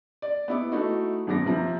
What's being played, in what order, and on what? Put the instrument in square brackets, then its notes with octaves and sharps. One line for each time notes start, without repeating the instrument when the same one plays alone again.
[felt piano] D5
B3 E4 D6
A3 D#4 E4 F#4
G#1 F#2 B3 D6 A#6
C3 F3 A#5